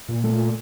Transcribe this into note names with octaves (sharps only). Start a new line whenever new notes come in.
A#2
A3